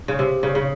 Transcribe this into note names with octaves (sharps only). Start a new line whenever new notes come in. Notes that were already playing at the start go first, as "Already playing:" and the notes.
C#3
C3
C#3
C#3